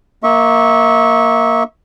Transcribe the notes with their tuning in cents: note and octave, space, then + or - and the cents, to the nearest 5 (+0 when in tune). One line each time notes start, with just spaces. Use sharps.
A#3 +0 E5 -30 C#6 -15